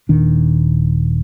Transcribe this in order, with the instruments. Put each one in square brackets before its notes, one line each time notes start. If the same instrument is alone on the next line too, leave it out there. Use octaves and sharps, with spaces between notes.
[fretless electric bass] D#1 A#2 D#3 D4